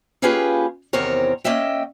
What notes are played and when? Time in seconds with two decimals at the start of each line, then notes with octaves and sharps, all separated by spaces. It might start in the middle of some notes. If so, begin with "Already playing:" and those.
0.22 A#3 C#4 F4 G4 G#4 B4
0.93 E2 C3 D#3 C4 A#4 C#5
1.44 A#3 C#4 D#5 E5 G5